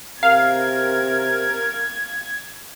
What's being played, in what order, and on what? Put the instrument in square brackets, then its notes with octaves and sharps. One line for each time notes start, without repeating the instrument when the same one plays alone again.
[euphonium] C3 [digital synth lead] A#4 [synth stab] F5 [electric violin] G#6